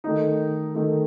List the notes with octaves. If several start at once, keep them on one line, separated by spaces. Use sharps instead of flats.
D#3 A3 D#4
D#3 A3 D#4